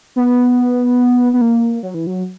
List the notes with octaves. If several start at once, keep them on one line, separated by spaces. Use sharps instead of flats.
B3
B3
A#3
F#3
E3
F#3